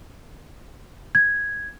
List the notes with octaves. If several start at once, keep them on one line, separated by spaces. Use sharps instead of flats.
G#6